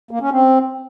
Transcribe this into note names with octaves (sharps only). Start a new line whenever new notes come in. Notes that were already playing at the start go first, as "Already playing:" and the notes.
A#3
C#4
C4